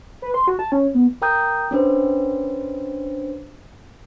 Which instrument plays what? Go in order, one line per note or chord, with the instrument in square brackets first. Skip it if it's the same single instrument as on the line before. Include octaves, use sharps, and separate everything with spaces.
[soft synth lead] B4
C6
F#4
A5
C#4
B3
[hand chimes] A#4 G5 A#5 D#6 G6
C#4 D4 B4 C5